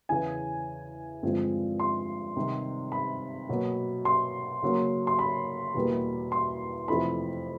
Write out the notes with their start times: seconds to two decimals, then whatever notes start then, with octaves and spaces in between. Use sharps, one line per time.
0.09 E2 C#3 E3 G#5
1.23 G2 D3 F3 G#3 C4
1.80 C6
2.36 C3 D#3 G3 C4
2.92 B5
3.49 B2 F#3 A#3
4.05 C6
4.63 C#3 F#3 A#3
5.07 C6
5.19 B5
5.74 E2 B2 G3 A#3
6.32 C6
6.88 F2 C3 E3 A3 B5